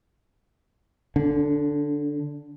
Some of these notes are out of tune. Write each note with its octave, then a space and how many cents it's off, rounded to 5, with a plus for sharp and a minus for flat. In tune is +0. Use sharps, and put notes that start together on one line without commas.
D3 +0 D4 -45